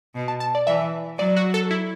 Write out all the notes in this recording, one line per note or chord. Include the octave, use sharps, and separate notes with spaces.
B2
A5
A5
D5
E3 E5
F#3 D5
F#4
A4
E4